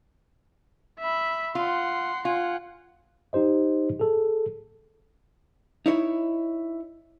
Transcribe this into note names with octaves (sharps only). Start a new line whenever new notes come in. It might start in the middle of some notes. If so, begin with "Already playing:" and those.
E5 B5
F4 F#5 C6
F4 F#5 G#5
D#4 G4 C5 D#5
G#4 A4
D#4 E4 C#5